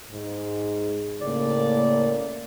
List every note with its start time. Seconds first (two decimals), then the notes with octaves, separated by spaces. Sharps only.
0.12 G#2
1.21 A2 C#3 A#3 D5